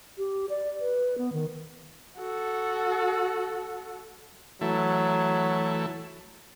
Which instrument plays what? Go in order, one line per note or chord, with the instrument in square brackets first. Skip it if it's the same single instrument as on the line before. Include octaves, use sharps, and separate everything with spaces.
[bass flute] G4
D5
B4
B3
D#3
[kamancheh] F#4 A4
[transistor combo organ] E3 A3 [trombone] F#3